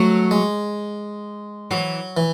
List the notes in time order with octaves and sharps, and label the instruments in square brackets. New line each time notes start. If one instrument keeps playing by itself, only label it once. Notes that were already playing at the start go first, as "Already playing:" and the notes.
Already playing: [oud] F#3 [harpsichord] A3
[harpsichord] G#3
[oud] E3 [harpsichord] F#3
[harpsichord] E3